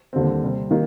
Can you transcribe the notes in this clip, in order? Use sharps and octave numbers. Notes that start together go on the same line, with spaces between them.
D#2 D3 G3 C4
C3 G3 C4
D#3 A#3